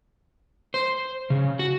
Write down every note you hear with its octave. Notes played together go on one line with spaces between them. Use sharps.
C5
C#3
F#4